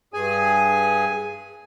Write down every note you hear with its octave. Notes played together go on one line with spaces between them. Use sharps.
G2 G#4 G#5